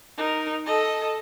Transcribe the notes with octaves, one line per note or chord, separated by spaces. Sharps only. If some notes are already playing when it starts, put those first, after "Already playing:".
D#4 A#4
A4 D#5